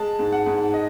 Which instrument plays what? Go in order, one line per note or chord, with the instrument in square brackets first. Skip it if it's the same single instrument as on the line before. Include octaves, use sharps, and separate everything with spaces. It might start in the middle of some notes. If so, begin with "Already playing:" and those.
Already playing: [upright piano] G#3 A5
G#2
F#5
G#2
D#5